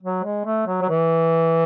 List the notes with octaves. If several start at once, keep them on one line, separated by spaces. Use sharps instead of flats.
F#3
G#3
A3
F#3
F#3
E3